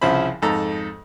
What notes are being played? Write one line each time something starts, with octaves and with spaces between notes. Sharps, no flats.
C2 C#3 F3 E4 C5 B5
F2 G#2 A4 A#5